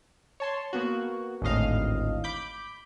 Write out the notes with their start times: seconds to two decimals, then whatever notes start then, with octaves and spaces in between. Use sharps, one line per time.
0.40 C#5 A5 C6
0.73 A#3 B3 F#4
1.42 G#1 D2 A2 D#5 F5
2.24 B5 D6 G6